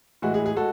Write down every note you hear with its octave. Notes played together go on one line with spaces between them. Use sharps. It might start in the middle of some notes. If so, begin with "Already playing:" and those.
A2 E3 G#3 F#4
G#4
G#4
G#3 F#4 A4